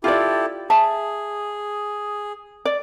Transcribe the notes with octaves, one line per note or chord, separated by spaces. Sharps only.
E4 F4 G4 A4 D5
G#4 E5 A5
D5